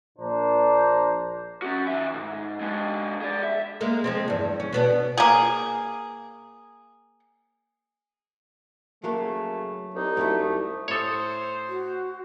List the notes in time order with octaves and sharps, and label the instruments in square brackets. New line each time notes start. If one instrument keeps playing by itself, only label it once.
[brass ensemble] A#1 A#2 D4 C5 A#5
[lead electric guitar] C#4 F#4
D#3 E5
B1 G#2
G#3 D4
G#4 D5
E5
[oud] G#3 A#3
F3 G#3 C4
E2 G2
C#4
B2 B3 D4
[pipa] A#3 G#4
[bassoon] C#3 [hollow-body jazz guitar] F#3 A#3 A#4 [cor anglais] A3
[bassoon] C2 [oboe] D#4
[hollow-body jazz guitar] F#2 C#4 E4 [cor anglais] A3
[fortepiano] A2 D#6 [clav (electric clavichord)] A4 C#5 [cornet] C5
[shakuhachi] F#4